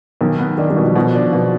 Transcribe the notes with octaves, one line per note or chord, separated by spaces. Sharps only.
B1 D#3
B3
D#3 D4
D#3 G3
B2
F3
B2 F3
D4
B2